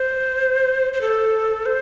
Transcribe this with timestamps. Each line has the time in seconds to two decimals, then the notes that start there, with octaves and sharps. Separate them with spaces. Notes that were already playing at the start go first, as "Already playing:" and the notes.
Already playing: C5
0.93 C5
1.01 A4
1.66 C5